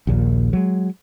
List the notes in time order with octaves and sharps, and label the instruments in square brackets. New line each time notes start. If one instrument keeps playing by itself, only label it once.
[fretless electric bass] A#1 D#2 A#2
F#3 G#3